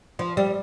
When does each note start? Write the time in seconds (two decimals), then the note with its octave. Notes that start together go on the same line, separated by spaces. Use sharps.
0.19 F3
0.37 G3